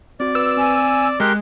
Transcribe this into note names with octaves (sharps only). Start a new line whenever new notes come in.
C4 F#4 D5
B4 E6
C4 G#5
G#3 G4 A#4 C6 F#6